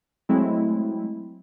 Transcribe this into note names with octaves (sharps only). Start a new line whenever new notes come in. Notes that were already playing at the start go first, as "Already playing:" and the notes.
F#3 G#3 A3 C4 E4